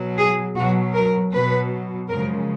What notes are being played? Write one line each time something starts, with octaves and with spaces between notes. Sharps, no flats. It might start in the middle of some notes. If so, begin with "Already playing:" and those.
Already playing: B2 F#3
G#4
B2 F#3 F#4
A#4
B2 F#3 B4
F#2 C#3 F3 G#3 A#4